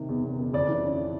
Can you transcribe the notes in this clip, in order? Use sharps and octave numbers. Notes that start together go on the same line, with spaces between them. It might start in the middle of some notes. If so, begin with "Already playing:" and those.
Already playing: C3 D#3
E2
E2
D#3
F2 D5
E3
C#3